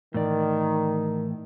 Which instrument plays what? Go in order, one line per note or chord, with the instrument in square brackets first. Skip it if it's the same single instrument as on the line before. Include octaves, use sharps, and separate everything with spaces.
[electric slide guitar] A2 E3 D5 [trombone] D#3